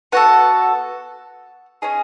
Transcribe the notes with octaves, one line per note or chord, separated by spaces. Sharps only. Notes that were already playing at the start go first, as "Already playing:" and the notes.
B3 F#4 A4 F#5
C#4 G#4 D#5